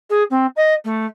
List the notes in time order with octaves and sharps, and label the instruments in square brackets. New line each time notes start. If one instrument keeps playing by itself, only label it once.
[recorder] G#4
C4
D#5
A3